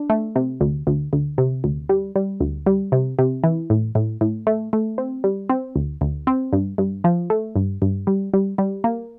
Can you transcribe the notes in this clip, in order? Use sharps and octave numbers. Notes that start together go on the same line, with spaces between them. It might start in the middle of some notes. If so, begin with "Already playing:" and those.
Already playing: D4
A3
C3
D2
D2
D2
C3
D2
G3
G3
D2
G3
C3
C3
E3
A2
A2
A2
A3
A3
C4
G3
C4
D2
D2
C4
G2
G2
F3
A3
G2
G2
G3
G3
G3
A#3